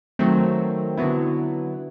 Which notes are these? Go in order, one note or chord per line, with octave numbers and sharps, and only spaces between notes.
D#3 F#3 A3 C4
D3 F#3 B3 E4